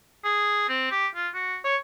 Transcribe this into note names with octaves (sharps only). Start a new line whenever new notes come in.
G#4
C4
G4
F4
F#4
C#5